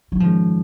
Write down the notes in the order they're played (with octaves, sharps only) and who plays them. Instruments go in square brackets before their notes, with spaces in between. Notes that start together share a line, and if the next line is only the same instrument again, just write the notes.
[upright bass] F#3
[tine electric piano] G#2 D#3 G#3 C#4 [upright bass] F3